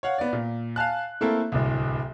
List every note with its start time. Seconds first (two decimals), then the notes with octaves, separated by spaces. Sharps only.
0.03 C#5 F5 F#5
0.18 B3 D5
0.33 A#2
0.76 F5 G#5 A5 F#6
1.21 A3 A#3 C4 E4 A4
1.52 D1 C2